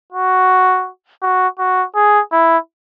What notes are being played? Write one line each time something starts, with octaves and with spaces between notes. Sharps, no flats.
F#4
F#4
F#4
G#4
E4